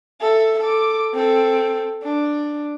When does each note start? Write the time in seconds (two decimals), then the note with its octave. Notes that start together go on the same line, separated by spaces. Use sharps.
0.21 A4 E5
0.60 A4 D6
1.14 C4 A4
2.03 D4